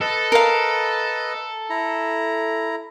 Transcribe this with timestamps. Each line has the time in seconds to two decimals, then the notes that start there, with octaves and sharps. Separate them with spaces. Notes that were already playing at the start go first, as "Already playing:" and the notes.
0.01 A4 B4 D#5
0.32 A#4 F5
1.70 E4 A#5